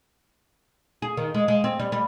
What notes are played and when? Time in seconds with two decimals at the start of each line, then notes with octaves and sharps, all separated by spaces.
1.02 G#4
1.17 D#3
1.34 G#3
1.48 G#3
1.64 C4
1.79 G3
1.92 G3